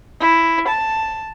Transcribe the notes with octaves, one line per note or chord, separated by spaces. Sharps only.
E4
A5